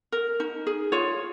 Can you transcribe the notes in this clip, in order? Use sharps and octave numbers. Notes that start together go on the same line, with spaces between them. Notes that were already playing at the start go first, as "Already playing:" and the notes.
A#4
D#4
G#4
F4 C#5